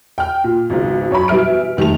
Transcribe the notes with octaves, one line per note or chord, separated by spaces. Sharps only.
G5 F6
A#2
G#1 C#2 G#2 B2
F#2 C#5 A#5 B5
B2 E3 G3 E5 F6 D7
F1 D#3 G3 A3 F7